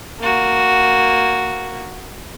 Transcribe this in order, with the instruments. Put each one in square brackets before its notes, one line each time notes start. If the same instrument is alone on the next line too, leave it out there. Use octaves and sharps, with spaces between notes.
[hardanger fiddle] A#3 F#4